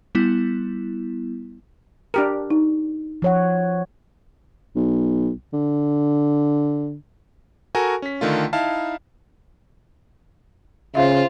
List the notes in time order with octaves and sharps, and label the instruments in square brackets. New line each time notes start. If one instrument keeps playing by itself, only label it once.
[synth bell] G3 B3 E4
[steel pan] D4 G4 A#4
[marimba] D#4
[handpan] F3 C#5 F#5
[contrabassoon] B1
D3
[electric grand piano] F#4 A4 A#4 G#5 C#6
C#4 B6
D3 D#3 A3 F4
D#4 E4 F5 A5
[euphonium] C#3 [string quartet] F4 C5 [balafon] E5 F5